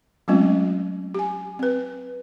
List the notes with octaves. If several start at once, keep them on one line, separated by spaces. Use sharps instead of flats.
F#3 G#3 A3 C4 C#4 F4
G4 G#5
C4 B4